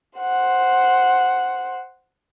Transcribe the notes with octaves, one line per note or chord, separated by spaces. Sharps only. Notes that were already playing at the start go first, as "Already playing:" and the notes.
C5 F#5